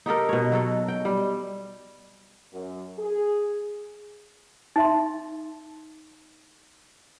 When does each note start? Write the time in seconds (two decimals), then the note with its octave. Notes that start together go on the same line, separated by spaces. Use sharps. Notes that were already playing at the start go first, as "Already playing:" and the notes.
0.06 D#4 G4 A4 A#4
0.29 B2 C#5
0.52 F#3 F#4 A4
0.88 G5
1.05 G3
2.52 F#2
2.98 G#4
4.76 D#4 E5 C6